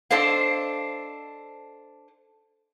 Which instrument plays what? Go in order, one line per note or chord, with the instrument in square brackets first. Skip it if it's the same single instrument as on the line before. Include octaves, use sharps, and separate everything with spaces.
[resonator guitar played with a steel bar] D4 A4 C5 D#5 F5